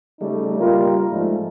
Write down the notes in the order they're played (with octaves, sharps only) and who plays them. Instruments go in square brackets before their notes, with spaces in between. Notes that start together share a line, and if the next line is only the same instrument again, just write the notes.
[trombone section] C#3 G3 A3 D#4
G3 A#3 F4 A#4
G#2 F3 G#3 A3